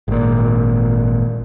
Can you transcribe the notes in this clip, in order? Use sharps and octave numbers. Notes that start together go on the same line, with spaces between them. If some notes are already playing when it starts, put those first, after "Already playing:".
G#1 A#2